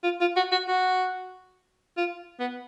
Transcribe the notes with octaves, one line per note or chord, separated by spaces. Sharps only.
F4
F4
F#4
F#4
F#4
F4
B3